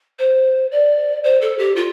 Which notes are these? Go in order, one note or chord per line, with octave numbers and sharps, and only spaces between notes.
C5
D5
C5
A4
G4
F4